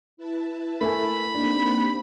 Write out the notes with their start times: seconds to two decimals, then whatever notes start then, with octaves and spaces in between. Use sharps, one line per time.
0.17 E4 B4 A5
0.81 A3 A#4 G#5 B5
1.35 A#3 C4 D4 D#4 G4